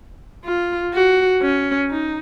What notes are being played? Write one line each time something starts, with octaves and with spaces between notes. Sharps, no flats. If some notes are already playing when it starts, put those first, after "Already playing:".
F4
F#4
C#4
D#4